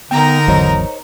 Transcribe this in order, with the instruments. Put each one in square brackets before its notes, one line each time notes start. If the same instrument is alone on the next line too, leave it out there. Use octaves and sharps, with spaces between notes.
[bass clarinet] D3 [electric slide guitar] B3 G5 [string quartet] D#4 A#4 A#5
[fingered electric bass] G#1 E2 F#3 [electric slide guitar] C5 C#5 D#5